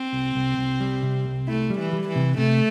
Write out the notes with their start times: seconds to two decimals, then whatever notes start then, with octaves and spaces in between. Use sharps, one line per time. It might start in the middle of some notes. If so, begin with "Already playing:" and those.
Already playing: C4
0.13 C2
0.35 C2
0.58 C2
0.80 G3
1.03 C3
1.25 C2
1.48 A3 E4
1.70 G3
1.78 E3
1.93 G3
2.08 E3
2.16 C3
2.38 C3 A3